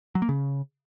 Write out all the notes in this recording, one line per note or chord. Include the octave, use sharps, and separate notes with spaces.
F#3
A#3
C#3